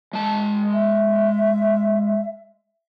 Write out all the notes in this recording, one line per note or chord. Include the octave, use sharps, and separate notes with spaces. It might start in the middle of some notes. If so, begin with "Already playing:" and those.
G#3 A5
E5